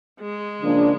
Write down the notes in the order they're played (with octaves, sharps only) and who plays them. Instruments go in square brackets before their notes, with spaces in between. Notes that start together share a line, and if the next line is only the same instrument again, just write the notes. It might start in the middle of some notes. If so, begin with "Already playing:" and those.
[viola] G#3
[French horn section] C#3 F3 A#3 D4